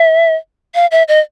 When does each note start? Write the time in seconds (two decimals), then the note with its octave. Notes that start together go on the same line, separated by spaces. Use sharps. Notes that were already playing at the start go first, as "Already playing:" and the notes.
Already playing: E5
0.75 F5
0.91 E5
1.08 D#5